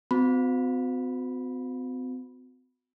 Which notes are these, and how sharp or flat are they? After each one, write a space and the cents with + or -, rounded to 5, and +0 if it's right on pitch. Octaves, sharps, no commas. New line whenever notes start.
C4 -45 F#4 -25 B5 -10